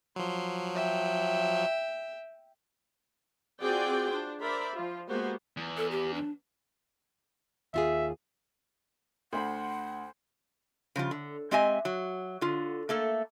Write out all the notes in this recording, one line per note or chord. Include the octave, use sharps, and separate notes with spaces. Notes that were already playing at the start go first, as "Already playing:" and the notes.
F3 F#3 C6
E5 G5
C4 F4 F#4 G#4 D5 G5
D4 C5
A#4 C5 D5 E5 B5
F3 F4
G#3 A#3 B3 F#4 G4 C5
E2
A4
G4
D4
D#2 F4 G#4 E5
D2 C5 F#5 B5 C6
C#3 F3 G3 F4
D3
G#3 C4 G4 D#5 E5 G#5
F#3
D3 F4
A3 A#3 A4